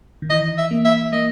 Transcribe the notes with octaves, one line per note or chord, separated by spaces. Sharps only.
D#3
E3 D#5
E5
A#3
E5
A#3 D#5